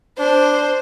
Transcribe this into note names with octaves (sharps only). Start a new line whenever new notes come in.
D4 C5